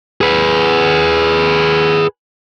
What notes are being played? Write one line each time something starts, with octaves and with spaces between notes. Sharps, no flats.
G#4 B4